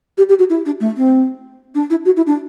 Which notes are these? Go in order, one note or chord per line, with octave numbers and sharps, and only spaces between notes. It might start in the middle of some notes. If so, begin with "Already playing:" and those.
G4
G4
F#4
E4
D4
A3
C4
D4
E4
F#4
E4
D4